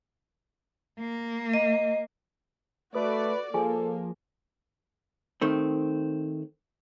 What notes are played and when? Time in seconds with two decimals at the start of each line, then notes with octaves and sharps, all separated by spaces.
1.00 A#3
1.53 D#5
2.95 A3 F#4 A4 B4 D5
3.54 F3 A#3 G#4 A4 G#5
5.41 D#3 A3 C4